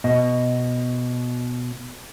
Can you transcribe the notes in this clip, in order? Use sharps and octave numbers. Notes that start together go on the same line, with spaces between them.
B2 D#5